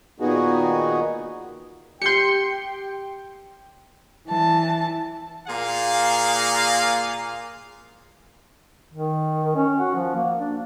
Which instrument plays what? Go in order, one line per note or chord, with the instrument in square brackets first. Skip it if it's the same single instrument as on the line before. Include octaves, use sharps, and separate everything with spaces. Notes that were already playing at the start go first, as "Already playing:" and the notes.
[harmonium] A#2 D#3 B3 D#4 F#4 G#4
[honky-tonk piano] G4 G6 [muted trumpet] G5 [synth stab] C6 C#7
[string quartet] E3 A5
[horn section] A#2 A#3 G#4 F5
[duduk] D#3
C#4
F#4
F3
A#3
D4